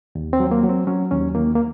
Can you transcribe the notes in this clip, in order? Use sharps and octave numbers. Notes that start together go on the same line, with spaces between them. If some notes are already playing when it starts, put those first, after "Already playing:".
D#2
C4
F#3
A#3
F#3
C4
F#3 C#4
D#2 C#4
D#3 A#3
A#3